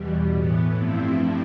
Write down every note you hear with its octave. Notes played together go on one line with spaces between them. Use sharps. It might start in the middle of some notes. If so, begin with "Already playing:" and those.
Already playing: E2 B2 G3
A2 E3 B3
G2 F3 A3 C4 E4